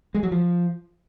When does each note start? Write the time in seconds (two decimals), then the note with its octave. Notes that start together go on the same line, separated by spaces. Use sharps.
0.15 G#3
0.23 F#3
0.32 F3